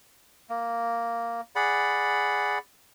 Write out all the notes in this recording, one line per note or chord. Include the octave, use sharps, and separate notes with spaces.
A#3
G#4 D5 F#5 B5